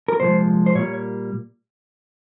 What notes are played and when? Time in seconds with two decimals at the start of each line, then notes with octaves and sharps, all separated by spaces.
0.08 A#4
0.20 C2 A#2 F3 G#3 C5
0.66 C5
0.75 A#2 G3 A#3 C#5